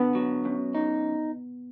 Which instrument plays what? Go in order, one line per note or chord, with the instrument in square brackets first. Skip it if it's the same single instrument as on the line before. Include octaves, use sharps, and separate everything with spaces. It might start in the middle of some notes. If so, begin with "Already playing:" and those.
Already playing: [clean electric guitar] D3 [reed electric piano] B3
[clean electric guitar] F#3
F#2
D#4